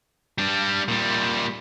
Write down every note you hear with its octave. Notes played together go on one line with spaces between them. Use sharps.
G3 D4
A#2 G3